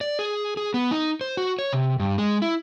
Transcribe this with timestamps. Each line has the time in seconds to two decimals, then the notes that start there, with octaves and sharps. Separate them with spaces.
0.01 D5
0.19 G#4
0.57 G#4
0.74 B3
0.91 D#4
1.21 C5
1.37 F#4
1.59 C#5
1.73 C3
2.00 G2
2.18 G#3
2.42 E4